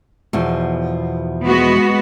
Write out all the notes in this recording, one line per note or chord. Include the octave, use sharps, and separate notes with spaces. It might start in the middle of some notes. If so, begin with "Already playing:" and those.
E2 B2 F3
G#3 B3 F#4